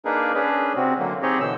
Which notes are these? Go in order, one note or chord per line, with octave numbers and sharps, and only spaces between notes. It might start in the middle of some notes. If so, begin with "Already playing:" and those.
A#3 D4 D#4 G#4 A#4 B4
C#4 D4 G#4 B4
C3 C4 F#4
D3 F#3 A#3
C4 D#4 G4 G#4 C#5 D#5
B2 D3 E3 E6